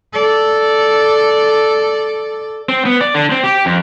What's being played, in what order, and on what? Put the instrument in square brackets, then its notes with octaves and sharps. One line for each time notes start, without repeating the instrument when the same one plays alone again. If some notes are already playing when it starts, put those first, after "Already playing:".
[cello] A4 D5
[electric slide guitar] C4
B3
D5
D3
C4
G4
F2